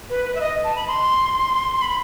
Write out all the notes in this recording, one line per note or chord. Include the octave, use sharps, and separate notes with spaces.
B4
B4
E5
D#5
A5
B5
C6
B5